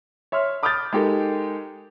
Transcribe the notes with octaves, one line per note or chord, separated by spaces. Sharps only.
C#5 E5 C6 F6
B5 D6 D#6 F6 G6 A6
G#3 D#4 G4 A4 A#4